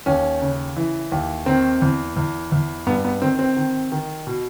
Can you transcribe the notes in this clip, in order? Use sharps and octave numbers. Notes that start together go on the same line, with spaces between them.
D#2 C#4
C#3
E3
D#2
D#3 C4
E2
E2
E2
G2 B3
B3
D#3 C4
C4
D#3
D#3
B2